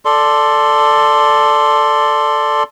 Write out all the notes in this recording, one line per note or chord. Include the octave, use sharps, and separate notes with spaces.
A4 D5 C6